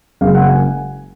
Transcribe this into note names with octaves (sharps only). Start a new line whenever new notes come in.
F#1 F#2 C#3 G#3 F5
F#5
G#5